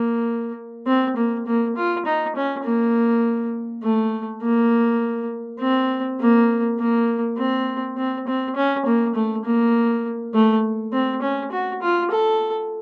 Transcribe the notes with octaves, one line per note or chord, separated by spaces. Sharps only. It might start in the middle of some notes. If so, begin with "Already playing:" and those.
Already playing: A#3
C4
A#3
A#3
F4
D#4
C#4
A#3
A3
A#3
C4
A#3
A#3
C4
C4
C4
C#4
A#3
A3
A#3
A3
C4
C#4
F#4
F4
A4